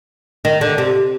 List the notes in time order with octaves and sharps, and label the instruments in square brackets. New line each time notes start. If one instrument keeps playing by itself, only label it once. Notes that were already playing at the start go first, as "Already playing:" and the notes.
[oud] D#3
D3
C3